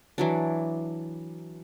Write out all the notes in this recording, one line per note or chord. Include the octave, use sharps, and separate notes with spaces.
E3 F#3 D4